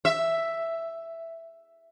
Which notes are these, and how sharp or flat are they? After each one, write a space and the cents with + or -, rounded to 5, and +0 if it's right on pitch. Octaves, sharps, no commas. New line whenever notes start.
E5 +5